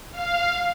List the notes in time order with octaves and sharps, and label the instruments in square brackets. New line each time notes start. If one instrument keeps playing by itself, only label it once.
[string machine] F5